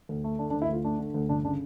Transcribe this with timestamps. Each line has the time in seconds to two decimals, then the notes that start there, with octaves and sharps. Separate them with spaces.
0.09 D2
0.24 A3
0.39 D3 D4
0.50 D4
0.54 D2
0.62 E4
0.69 D2 F4
0.84 A3 D4
0.99 D3
1.14 D2
1.29 G1 D4
1.45 C#3 D4